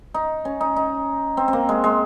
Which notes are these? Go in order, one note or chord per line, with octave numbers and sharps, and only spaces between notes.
D#4
C#4
D#4
D#4
C4
C4
A#3
G#3
G#3